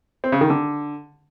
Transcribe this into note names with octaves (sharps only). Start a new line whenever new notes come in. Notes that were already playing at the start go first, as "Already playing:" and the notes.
C4
C#3
D#3
D3